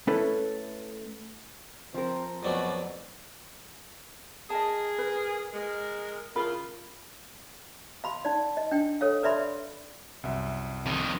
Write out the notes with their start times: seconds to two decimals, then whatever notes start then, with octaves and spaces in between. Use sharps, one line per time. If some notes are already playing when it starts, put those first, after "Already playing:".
0.07 A3 C#4 E4 A4 B4
1.94 F3 C4 A#4
2.43 F2 B2 F#3 A3 D5
4.50 G#4 A#4 D#5 A5
4.98 B4
5.54 G#3 A#4
6.35 C#3 E4 F4 G#4 A#4 B5
8.04 F5 B5 C6
8.25 D#4 D5
8.57 D#5
8.71 D4 G5
9.01 A4 C#5 F5
9.23 B4 D5 E5 B5 C6
10.24 C2 F#2 E5
10.86 F2 D#3